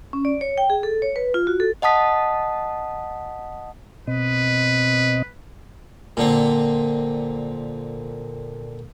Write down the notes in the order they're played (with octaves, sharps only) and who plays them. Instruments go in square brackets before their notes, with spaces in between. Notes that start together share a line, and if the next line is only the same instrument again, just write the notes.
[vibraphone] C#4
D5
C#5
G5
G#4
A4
C#5
B4
F4
F#4
A4
[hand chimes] D#5 F#5 A5 D#6 B6
[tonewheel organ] B2 C4 D#5 [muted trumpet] B4
[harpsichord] A#2 D3 C4